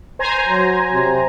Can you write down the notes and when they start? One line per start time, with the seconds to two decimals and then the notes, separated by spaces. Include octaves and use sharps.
0.19 C5 G#5 A#5
0.49 F#3
0.94 C3